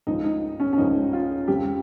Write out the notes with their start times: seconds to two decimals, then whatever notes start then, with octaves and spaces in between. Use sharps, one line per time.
0.07 C#2 C#3 F3 D#4
0.24 D#4
0.60 C#4
0.73 C#4
0.77 C#2 C#3 F3 D#4
1.13 F4
1.48 F2 C#3 F3 G4